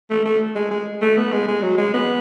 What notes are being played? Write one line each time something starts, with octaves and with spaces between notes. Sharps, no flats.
A3
A3
G#3
G#3
A3
B3
G#3
G#3
F#3
G#3
B3